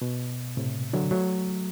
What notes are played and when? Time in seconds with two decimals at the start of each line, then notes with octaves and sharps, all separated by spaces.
0.02 B2
0.57 A2 C3
0.93 D3 F#3
1.11 F#3 A3